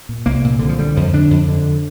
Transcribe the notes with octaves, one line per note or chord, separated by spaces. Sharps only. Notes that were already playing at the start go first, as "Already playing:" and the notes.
A#2
C2 A#3
A#2
C2 D3
F3
D3 G3
F2 F3
D3 D4
F2
D3